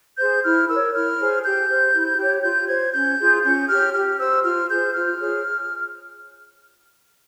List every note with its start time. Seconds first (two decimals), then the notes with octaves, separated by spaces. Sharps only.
0.18 G#4 C5 G6
0.44 E4 F6
0.68 A#4 C#5 E6
0.94 E4 F6
1.19 G#4 C5
1.44 G4 G6
1.69 C5
1.94 E4
2.18 G4 C#5
2.44 F4 G6
2.69 C5 G#6
2.93 C#4 G6
3.19 F4 G#4
3.44 C#4 G6
3.69 G4 C#5 F6
3.94 G4 F6
4.19 C5 E6
4.44 F4 F6
4.69 G#4 C5 G6
4.94 F4 F6
5.18 G#4 C#5